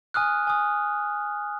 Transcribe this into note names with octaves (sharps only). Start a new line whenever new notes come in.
G#5 D#6 F6 F#6
G#5 D#6